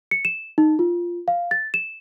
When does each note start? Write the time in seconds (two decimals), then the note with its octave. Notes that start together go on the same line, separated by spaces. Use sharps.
0.11 C#7
0.25 E7
0.58 D#4
0.79 F4
1.28 F5
1.51 A6
1.74 E7